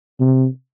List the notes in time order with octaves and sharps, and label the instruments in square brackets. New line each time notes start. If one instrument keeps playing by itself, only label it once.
[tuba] C3